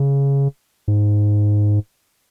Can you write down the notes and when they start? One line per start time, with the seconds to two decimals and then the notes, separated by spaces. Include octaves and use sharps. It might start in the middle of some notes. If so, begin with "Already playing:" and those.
Already playing: C#3
0.88 G#2